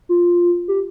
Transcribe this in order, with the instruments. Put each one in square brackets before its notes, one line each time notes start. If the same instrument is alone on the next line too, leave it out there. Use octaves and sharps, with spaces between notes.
[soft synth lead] F4
G4